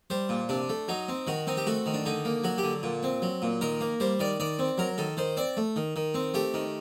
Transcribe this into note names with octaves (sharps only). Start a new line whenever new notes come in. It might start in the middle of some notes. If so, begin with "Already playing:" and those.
G3 C5
A#2
C3 D4
A3
F#3 D#4
C4
D#3 F#4
C4 D#4
G4
A3 F#4
D#3
D4
D3 D#4
A#3
F#3 F#4
G4
D3
A#2
C4
F#3
A#2
D#3 A#4
A#3
G3 C5
D#3 D5
D#3 D5
C4
F#3 A#4
D#3 A4
D#3 C5
C4 D5
A3
D#3
D#3
C4
A3 G4
D#3